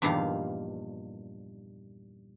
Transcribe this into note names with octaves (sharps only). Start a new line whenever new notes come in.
E2 G2 A#2 D#3 F3 F5